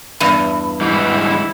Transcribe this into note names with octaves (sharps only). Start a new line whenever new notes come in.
E2 G2
G#2 E3 G3 E4